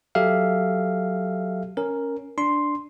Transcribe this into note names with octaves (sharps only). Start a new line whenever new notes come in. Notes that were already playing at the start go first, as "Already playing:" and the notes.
F#3 G4 A4 E5 F5
C#4 A#4
D4 C6